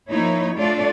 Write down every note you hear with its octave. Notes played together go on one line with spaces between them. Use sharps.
F3 A#3 D#4 E4 C#5
A3 D4 F4 A4 D5